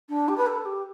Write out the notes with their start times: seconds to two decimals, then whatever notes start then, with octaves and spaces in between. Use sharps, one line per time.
0.09 D4
0.28 G4
0.37 B4
0.46 A4
0.65 G4